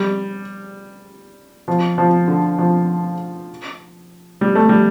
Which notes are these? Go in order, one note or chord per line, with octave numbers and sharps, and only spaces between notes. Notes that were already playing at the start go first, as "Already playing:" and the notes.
Already playing: G3
F3
F3
D3
F3
G3
A3
G3